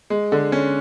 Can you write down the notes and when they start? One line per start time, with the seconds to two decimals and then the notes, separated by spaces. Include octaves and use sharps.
0.10 G#3
0.32 D3
0.52 C#4